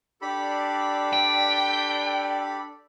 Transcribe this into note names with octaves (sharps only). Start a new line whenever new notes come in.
D4 G4 A4 D5 B5
G5